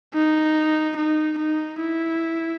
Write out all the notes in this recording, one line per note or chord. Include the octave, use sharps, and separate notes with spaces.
D#4
D#4
D#4
E4